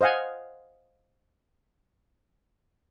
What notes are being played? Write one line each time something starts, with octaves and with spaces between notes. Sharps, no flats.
C5 D#5 F5 F#5 G#5